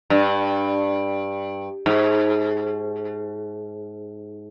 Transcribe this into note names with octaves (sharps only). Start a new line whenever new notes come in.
G2
G#2